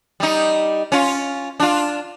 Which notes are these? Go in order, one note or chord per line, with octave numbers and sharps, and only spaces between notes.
G3 D#4
C#4 F4
D4 F4